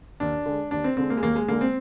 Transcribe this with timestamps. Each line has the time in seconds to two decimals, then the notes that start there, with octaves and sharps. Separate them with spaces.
0.20 D#2 D4
0.46 D3 G#3
0.71 D#2 D4
0.84 C4
0.97 D3 G#3 C4
1.10 A#3
1.17 G#3
1.22 D#2 A#3
1.35 G#3
1.48 D3 G#3 A#3
1.61 C4